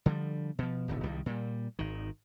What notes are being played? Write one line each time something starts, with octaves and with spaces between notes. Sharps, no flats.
D3 F3 G3
B2 F3
D1 G#1 B2 D3
C2 D#3 G3
A#2 G3
G#1 D#3